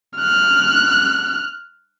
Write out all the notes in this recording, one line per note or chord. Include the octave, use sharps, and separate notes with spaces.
F6 F#6